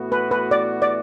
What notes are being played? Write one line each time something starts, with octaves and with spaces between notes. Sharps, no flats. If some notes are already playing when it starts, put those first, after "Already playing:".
Already playing: A2 E3 B3 F#4
B4
B4
D5
D5